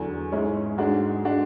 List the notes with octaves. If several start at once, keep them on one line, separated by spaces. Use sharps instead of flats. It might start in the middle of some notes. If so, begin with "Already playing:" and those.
Already playing: E2 D3 F#3
G#2 G#3 C#4 E4
G#2 G#3 D4 F#4
G#3 D4 F#4